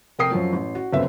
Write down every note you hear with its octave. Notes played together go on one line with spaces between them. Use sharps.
F1 A#4 G5 D#6 C7
F#2 F3 F#3
A1
F#4
G1 C#2 F#2 C4 B4 E5